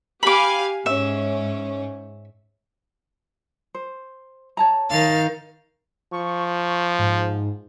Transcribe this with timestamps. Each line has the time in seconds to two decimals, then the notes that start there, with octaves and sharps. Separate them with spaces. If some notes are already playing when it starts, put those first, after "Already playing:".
0.23 G4 F5 G#5 B5 D6
0.86 G#2 C#4 E5
3.75 C5
4.57 C#5 A5 A#5
4.90 D#3 F5 A6
6.12 F3 C#6
6.99 G#2